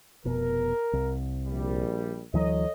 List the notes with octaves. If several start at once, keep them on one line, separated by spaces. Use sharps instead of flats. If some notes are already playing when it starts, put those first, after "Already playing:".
F1 B2 A#4
C2
A#1 G3
D2 E3 F#3 A4 C#5 D#5